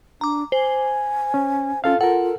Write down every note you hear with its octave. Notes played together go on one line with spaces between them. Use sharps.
D4 A#5 D6
C5 G#5
C#4
C#4 F4 A4 F5
F4 A4 A#4 F#5